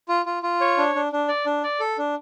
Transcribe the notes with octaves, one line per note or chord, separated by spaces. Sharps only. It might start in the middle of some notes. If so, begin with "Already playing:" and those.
F4
F4
F4
C#5
D4
D4
D4
D5
D4
D5
A4
D4